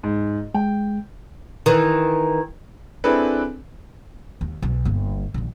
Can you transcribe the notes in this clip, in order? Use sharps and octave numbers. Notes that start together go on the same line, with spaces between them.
G#2
G#3 G5
D#3 E3
C4 D4 E4 G#4 A4 B4
D#2
B1
G1 A#3
A#1 D#3